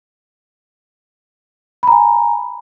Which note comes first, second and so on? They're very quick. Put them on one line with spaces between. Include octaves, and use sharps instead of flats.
B5 A#5 G#5